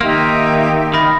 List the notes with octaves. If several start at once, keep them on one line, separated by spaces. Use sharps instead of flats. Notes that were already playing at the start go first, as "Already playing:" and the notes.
D#3 A#3 D#4 G4 E5 C6
D#3 B5 A#6